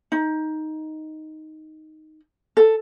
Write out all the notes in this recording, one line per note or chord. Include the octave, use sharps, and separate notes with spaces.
D#4
A4